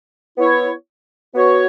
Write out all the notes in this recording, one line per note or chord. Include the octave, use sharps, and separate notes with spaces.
B3 E4 C#5
B3 F#4 C#5